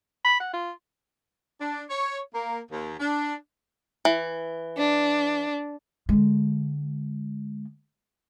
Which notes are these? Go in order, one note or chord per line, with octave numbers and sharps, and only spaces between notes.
B5
F#5
F4
D4
C#5
A#3
D#2
D4
E3
D4
D3 G#3